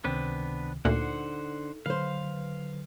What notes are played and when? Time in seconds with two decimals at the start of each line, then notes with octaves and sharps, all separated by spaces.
0.04 C#2 C3 D#3 B3 C4 D4 B4
0.85 D2 A#2 D3 D#4 C5 F#5
1.86 D3 F#3 B4 C5 F5